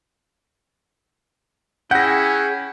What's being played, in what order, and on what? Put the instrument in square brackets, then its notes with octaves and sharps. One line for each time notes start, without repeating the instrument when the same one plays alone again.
[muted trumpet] C#4 [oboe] E4 [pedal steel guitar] G#4 G5 [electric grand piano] F#5 A#6